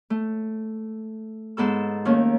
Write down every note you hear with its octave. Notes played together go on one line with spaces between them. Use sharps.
A3
G#2 B3 A4 E6
D#2 A3 A#3 C#4